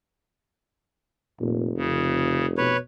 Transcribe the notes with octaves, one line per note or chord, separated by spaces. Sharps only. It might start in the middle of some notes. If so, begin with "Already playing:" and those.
F1 A#2
F2 C#3
B2 B4 C#5